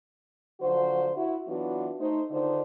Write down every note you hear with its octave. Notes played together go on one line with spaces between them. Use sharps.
D3 F3 F#3 F#4 C5
E4 F#4
E3 F#3 B3 D4 F4 F#4
A3 D#4 C5
D3 D#3 D4 D#4 F4 C5